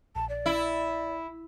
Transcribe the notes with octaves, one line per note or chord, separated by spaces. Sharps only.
A#1 A5
D5
E4